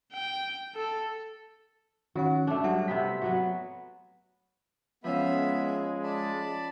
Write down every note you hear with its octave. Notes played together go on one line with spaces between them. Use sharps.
G5
A4
D#3 C#4 F#4 F#5
A3 D4
F#3 G3 D4 F#5
C3 B3 C4 B6
F#3 B3 F#4
F3 G#3 B3 C#4 E5 F5 B5
D5 A5 B5